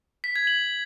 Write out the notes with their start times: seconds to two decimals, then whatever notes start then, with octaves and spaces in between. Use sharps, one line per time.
0.24 B6
0.36 G#6
0.47 F#7